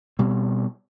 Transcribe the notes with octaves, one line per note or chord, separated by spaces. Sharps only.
B2 G3 C4